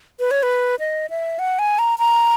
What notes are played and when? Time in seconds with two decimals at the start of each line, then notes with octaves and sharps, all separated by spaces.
0.20 B4
0.31 C#5
0.43 B4
0.79 D#5
1.10 E5
1.39 F#5
1.59 G#5
1.79 A#5
1.99 A#5